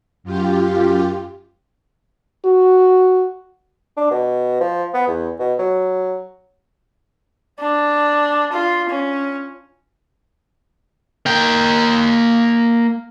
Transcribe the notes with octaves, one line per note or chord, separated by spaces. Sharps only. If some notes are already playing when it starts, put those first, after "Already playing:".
F#2 F4 G4
F#4
D4
B2
F3
B3
E2
B2
F#3
D4
F4
C#4
A#3 G5